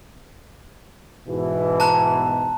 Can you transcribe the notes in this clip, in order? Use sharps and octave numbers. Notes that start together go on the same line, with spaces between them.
G#2 B2 E3
A5 A#5 F#6